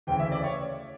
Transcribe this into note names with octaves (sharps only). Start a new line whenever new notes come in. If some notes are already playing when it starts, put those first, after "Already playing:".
D2 C#3 E3 G5
E5
D5
C#5